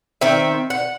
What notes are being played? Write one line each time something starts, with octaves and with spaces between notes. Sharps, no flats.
D#3 C4 E5
F#5